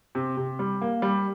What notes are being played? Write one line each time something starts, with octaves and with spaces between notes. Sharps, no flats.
C3
C3
G3
A#3
G3